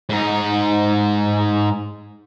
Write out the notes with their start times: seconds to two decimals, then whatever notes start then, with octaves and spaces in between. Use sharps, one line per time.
0.10 G#2 D#4